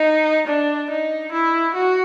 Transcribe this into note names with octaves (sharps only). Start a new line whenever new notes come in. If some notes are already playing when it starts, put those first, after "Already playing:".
Already playing: D#4
D4
D#4
E4
F#4